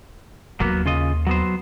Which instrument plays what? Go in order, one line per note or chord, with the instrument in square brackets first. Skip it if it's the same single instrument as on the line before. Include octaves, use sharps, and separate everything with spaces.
[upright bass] D#2 [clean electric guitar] F#3 A#3 B3
[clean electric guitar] C#3 F4 D#5
F#3 B3 C5